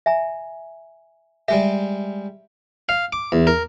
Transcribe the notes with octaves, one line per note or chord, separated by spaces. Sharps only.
E5 G#5 A#5
G3 G#3 G4 E5
F5
D6
E2
A#4